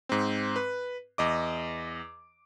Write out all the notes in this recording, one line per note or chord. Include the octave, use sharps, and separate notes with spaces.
G#2 C4
B4
E2 D#5 D6